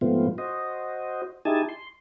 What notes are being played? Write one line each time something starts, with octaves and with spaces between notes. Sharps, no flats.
G#2 F3 A3 B3 C4 F4
F#4 C5 D#5
D#4 E4 G4 G#4 G#5 A5
C6